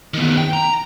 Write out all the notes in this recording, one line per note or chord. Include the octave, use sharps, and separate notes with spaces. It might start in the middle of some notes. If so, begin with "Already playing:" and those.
D#3 B3
G5
A#5